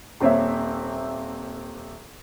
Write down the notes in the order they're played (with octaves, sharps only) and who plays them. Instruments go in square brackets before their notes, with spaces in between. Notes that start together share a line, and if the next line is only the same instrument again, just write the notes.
[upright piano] D#1 A#3 C4 C#5 E5